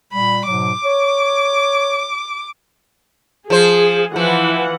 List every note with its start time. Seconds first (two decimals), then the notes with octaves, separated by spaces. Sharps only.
0.13 A#2 G3 B5
0.47 G#2 B2 F#3 D6
0.85 C#5
3.50 F3 G#4 C5
4.16 E3 F3 F#5